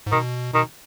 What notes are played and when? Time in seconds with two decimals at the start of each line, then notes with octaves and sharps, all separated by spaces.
0.07 G#2
0.12 B2 D#3
0.54 B2 D#3